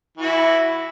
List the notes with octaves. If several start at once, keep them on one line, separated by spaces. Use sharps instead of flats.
E3 E4 F#4